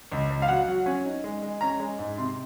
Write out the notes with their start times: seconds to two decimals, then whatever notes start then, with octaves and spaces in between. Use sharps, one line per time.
0.12 C#2
0.30 C#2
0.42 F5
0.48 F#3 F#5
0.68 F#3
0.86 C#4
1.05 D#4
1.24 G#3
1.42 G#3
1.61 C#4 A#5
1.80 G#3
1.99 G#2
2.18 C3 C6